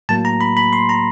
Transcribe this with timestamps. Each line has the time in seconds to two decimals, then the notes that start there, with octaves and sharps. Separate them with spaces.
0.09 A2 F#3 A#3 A5
0.25 A#5
0.41 B5
0.57 B5
0.73 C6
0.89 A#5